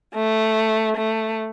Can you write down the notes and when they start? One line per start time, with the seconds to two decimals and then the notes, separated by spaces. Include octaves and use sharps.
0.15 A3
0.96 A3